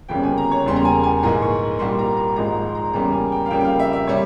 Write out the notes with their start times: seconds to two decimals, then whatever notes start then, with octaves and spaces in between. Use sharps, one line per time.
0.09 G1 F2 C#3 G3 A#3 G5
0.23 G#5
0.37 A#5
0.51 C#5
0.65 E1 E2 C#3 G3 A#3 C6
0.76 A#5
0.85 G#5
1.03 G#5
1.23 A#1 G#2 E3 A#3 G#5
1.42 C#6
1.79 C2 A#2 G3 A#3 C6
1.99 A#5
2.17 A#5
2.36 G#1 G#2 F3 G#3 A#5
2.65 C6
2.75 A#5
2.93 E2 C#3 G3 A#3 A#5
3.12 G#5
3.32 G5
3.46 F5
3.50 F2 C#3 G3 A#3 G5
3.61 G5
3.65 F5
3.79 E5
3.93 E5
4.07 C3 G3 C#5